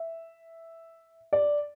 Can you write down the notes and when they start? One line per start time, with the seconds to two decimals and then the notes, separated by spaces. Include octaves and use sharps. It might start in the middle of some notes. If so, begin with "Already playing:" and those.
Already playing: E5
1.33 D5